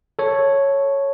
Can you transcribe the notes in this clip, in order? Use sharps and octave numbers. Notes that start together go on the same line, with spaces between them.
A4 C#5